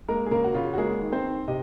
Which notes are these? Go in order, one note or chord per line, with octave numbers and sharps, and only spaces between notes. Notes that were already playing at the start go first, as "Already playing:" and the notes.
G#3 A#3 A#4
G#4
C#3 A#3 A#4
F#4
C#3 F4
F#4
G#3 A#3 G#4
D#3
C4 C5
D#3
C3 D#5